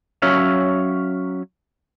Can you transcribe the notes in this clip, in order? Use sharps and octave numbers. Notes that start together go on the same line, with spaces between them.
F#3 C#4 C#5 E5 F5